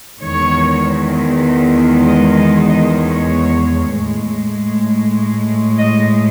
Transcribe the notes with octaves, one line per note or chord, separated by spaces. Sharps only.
E2 D#3 G#3 C#5
D#5
D#5
D#5
C#5
A2 G#3
D#5